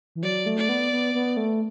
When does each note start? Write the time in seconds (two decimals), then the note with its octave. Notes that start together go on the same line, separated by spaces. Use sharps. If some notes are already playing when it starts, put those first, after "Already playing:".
0.15 E3
0.23 F#3 D5
0.46 A3
0.58 D5
0.69 B3
0.92 B3
1.14 B3
1.37 A3